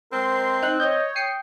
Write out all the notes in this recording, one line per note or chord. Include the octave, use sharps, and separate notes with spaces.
G#3 C4 A#4 C5 C6
D#4 F#6
C#5 D#5 G6
G5 D#6 C7 C#7